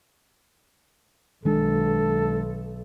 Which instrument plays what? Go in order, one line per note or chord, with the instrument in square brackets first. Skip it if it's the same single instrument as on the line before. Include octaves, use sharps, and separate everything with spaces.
[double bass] B1 [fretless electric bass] D#3 G#3 D4 [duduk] A4